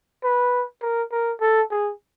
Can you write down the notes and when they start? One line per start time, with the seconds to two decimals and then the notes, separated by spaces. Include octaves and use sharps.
0.24 B4
0.82 A#4
1.11 A#4
1.41 A4
1.71 G#4